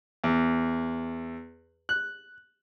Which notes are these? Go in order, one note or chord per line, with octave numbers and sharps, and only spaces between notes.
E2
F#6